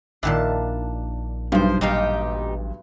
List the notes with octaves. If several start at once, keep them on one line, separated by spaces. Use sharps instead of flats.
A#1 A#2 D#3 D4 E4 A5
B1 G2 F3 C5
A1 A#2 D#4 G4 F5 A5